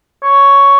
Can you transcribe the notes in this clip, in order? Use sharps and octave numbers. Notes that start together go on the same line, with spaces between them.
C#5